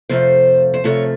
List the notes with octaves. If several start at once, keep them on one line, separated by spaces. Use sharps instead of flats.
F2 C3 F3 A3 C5
C5
F2 C3 F3 A3 C#5